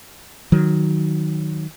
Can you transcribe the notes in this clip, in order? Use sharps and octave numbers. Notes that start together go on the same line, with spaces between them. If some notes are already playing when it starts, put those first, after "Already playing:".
D#3 F#3